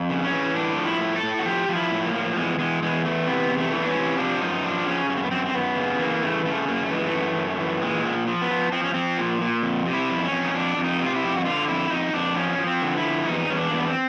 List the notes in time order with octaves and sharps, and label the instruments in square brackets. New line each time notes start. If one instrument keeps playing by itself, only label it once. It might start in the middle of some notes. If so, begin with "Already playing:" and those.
Already playing: [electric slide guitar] F2
C#3
C#4
E3
A2 D4
F3
E4
A2
A4
A2
F#4
F3 G4
F3
E4
A2
A#3
F3
E2 G#3
E2 G#3
E2 G#3
E3 A3
C3 B3
E2
A3
E3
D4
C#4
C3
F3 D4
F#2 D#4
F3 D4
C#3 C#4
F#2 C#4
C4
B3
F#2 C4
C4
F#2 B3
C#3
E3 A#3
C#3 A3
C#3 A3
F#2 A#3
A3
E3 G#3
A3
F#2
F#2
E3
A#2 G#3
F3
F3
B3
F3
F3 C4
C#4
F3 C4
A#2
A#2
F2
C3
E4
F2
C#4
F2
D#4
F2 D4
F2
D#4
C3
F4
E4
F2 G4
F#4
D3 F4
F2 E4
F2 D#4
F2 D4
F3 C#4
F3
C4
D3
E4
F3
E2 D#4
E2 C#4
D4
E2 A#3
B3
C4